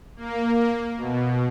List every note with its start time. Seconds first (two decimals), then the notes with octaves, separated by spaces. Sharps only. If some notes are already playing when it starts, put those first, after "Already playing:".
0.16 A#3
0.97 B2